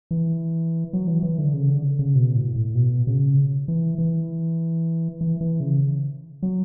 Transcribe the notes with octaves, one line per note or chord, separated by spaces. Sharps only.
E3
F#3
E3
E3
D3
C#3
D3
C#3
B2
A2
A2
B2
C#3
E3
E3
E3
E3
C#3
F#3